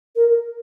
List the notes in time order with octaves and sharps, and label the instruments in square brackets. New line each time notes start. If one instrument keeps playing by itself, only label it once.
[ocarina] A#4